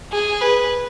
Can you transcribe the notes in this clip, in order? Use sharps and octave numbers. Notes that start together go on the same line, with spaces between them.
G#4
B4